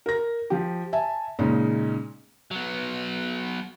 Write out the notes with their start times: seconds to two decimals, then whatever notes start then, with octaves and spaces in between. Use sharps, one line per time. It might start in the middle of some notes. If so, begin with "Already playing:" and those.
0.06 A#4 A#6
0.50 F3 G4
0.93 E5 G#5 A5
1.39 A#2 C#3 G#3 C#4 D#4
2.51 F#3 B3